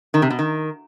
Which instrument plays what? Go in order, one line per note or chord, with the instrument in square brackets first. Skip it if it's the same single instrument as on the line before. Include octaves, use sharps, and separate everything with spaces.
[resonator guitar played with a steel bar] D#3
C3
B2
D#3